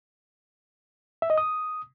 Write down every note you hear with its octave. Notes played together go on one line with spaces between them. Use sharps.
E5
D#5
D#6